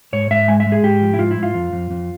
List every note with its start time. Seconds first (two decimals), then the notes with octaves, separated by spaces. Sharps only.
0.13 G#2 C#5
0.31 G#2 E5
0.48 G#3 G#5
0.60 E5
0.66 G#3
0.72 G#4
0.83 G#2 G4
1.02 F3
1.14 E4
1.19 G#2 F4
1.31 E4
1.37 G#2
1.43 F4
1.55 F2
1.73 F2
1.91 F2